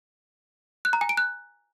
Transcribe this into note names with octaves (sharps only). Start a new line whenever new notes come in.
F#6
A#5
G#5
D7
F#6